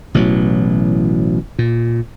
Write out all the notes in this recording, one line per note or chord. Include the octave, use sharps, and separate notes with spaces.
A1 B2 E3 F#3
A#2